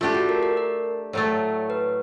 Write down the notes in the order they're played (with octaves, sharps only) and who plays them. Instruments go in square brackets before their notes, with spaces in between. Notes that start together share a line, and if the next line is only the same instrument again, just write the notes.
[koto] A3 D4 G4 [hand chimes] F4
[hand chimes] F#4
A#4
A#4
A#4
[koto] A2 F#3 A3
[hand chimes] B4